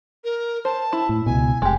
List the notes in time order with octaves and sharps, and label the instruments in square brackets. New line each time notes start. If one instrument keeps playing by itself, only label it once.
[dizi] A#4
[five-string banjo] C5 [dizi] A5
[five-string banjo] E4
[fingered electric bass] A2
[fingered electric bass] C#2 B2 [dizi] G#5
[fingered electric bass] F1 [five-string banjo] G#3 G4